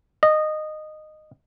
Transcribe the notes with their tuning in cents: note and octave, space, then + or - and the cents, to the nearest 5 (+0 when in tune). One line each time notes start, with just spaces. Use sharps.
D#5 -15